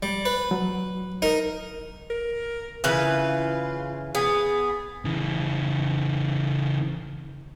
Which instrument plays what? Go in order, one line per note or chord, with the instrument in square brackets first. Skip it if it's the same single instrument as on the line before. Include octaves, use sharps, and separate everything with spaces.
[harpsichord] G3
B4
[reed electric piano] F#3
[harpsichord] D#4 A#4
[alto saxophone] A#4
[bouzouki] C#3 E3 B4 [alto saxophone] F4
[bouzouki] B3 [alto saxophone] G#4
[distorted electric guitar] C#3 E3